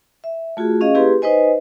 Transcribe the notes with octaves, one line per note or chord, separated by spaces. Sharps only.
E5
A3 F4 F#4 G#4
C#4 G#4 D#5 F5
A#3 E4 G4 G#4 B4 C6
D#4 B4 C5 D#5 G#5